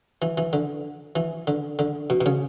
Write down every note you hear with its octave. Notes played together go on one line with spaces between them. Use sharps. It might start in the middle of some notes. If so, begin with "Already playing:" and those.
E3
E3
D3
E3
D3
D3
B2
B2
C#3